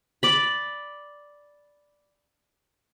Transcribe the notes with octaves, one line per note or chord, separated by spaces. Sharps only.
D5 B5